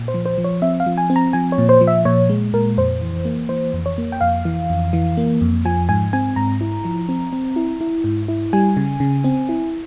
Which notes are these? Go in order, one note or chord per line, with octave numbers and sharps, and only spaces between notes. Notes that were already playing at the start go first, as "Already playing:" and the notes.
Already playing: A#2
C5
F3
C5
F3
C#5
C4 E5
F5
F3
G#5
C4
A#5
F3 G#5
C#5
A#2
C5
F3
E5
A#2 C#5
G#3
A#2 A#4
F2 C5
E3
A#3
E3 C5
F2
C#5
A#3
G5
F2 F5
E3
F2
E3
A#3
F2
F3 G#5
G#2 G#5
C4 G#5
G#2 A#5
E4
F3
C4
C4
E4
E4
G#2
E4
G3 G#5
C#3
C#3
C4
E4